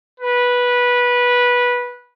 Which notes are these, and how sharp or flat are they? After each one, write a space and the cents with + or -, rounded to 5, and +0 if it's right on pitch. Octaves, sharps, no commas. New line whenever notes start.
B4 -15